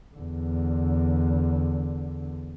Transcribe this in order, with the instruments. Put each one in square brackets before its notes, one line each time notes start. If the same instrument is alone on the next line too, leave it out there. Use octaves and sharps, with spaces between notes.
[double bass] E2 D3